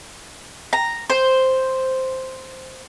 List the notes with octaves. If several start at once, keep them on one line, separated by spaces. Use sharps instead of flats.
A#5
C5